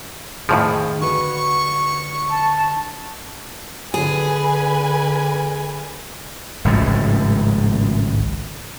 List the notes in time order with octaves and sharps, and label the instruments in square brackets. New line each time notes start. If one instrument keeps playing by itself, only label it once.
[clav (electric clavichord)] F2 A2 F3 [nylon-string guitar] D#3 G#4
[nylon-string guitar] D3 F#4 B4 [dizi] C#6
[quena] A5
[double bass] D3 [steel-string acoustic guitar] G#4 [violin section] B4 G#5
[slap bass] G#1 C#2 A2 F3